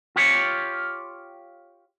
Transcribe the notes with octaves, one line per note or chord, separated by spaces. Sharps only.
F4 G4 C#5